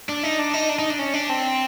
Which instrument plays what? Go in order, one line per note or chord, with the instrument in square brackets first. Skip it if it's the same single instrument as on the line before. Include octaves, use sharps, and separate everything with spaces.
[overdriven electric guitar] D4
D#4
D4
D#4
D4
D#4
D4
C#4
D4
C4